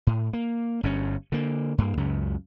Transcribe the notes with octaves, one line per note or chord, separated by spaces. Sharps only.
A2
A#3
G1 G2 C#4
D3 A#3
G2 A#3
C#2 F#2 C#3